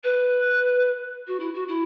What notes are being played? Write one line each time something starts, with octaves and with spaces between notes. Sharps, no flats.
B4
F#4
E4
F#4
E4